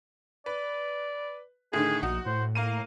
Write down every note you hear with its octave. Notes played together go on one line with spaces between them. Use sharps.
B4 D5
A2 D3 D#3 G#4
A#1 D#4 F#4
A2 C5
A#3 F5 A#5 D#7